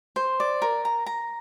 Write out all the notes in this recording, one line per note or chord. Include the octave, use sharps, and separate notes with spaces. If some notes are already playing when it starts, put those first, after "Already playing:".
C5
D5
A#4
A#5
A#5